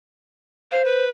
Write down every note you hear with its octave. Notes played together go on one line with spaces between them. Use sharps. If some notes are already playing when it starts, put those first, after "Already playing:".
C5 F5
B4